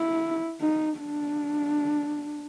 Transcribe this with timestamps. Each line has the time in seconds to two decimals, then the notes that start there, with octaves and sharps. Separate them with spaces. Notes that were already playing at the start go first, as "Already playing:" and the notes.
Already playing: E4
0.61 D#4
0.99 D4